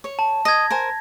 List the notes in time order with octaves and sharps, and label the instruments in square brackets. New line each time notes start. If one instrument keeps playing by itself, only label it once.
[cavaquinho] C#5
[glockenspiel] A5
[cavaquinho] D#5 [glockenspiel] G#6 A#6
[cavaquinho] A#4 C5 G#5